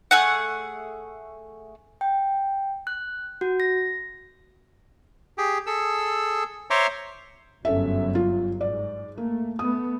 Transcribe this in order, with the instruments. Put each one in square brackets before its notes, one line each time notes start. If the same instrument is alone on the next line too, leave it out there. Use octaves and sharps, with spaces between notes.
[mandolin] A3 G#4 F#5
[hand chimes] G5
F#6
F#4
A#6
[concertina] G4 G#4
G#4 A4 E6
C5 C#5 E5 A#5 C6 D6
[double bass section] G1 F#2 F#3 [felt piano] C#4 A4 E5
[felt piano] F4
[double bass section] G#2 [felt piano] D5
[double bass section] A3 [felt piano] A#3
[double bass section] A3 B3 [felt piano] D#6